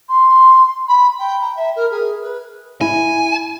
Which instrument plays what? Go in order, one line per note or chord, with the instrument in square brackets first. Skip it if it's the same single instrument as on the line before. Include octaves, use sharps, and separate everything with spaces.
[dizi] C6
B5
G5
A#5
E5
A#4
G#4
B4
[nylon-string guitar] E4 [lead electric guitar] G#5